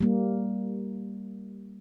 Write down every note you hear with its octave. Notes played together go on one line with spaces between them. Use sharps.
G3 A#3